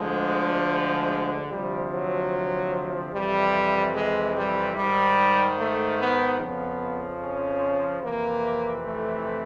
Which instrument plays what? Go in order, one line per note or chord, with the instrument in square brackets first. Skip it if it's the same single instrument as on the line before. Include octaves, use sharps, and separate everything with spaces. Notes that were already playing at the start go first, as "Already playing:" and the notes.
Already playing: [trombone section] D2 D3 F3 G#3
G#3
D2 C3 F3 G3
F#3
F2 C3 E3 G3
G#3
G3
G#2 D#3 G3
A3
B3
F2 C#3 F3 B3
C#4
F2 C3 E3 A#3
A3